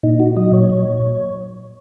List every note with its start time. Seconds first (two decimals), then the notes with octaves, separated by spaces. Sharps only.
0.03 A#2 D#4
0.20 F#4
0.36 F#3 D#5
0.53 C#5
0.70 A#2